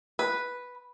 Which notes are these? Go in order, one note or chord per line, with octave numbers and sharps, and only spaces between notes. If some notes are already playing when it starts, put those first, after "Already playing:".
B4